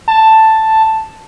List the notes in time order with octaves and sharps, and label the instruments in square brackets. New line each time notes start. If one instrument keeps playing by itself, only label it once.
[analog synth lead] A5